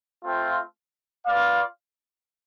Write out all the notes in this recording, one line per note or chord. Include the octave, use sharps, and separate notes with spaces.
A3 C4 F4
F4 B4 D5 F5